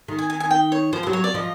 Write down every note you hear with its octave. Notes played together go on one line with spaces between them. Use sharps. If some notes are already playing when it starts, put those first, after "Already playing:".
D#3
G#5
G#5
G#5
G5
C#5
F3 C5
F#3 C5
C#5
D5
F3 D#5